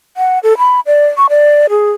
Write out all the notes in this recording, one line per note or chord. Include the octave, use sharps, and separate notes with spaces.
F#5
A4
B5
D5
C#6
D5
G#4